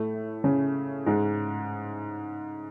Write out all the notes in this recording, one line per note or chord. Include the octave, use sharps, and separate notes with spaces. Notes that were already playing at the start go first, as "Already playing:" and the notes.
Already playing: A2 A3
C#3 C#4
G#2 G#3